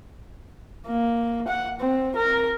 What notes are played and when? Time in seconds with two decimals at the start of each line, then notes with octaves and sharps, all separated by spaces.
0.87 A#3
1.48 F#5
1.80 C4
2.16 A#4